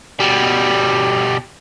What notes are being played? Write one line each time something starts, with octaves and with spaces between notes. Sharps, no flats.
B2 G3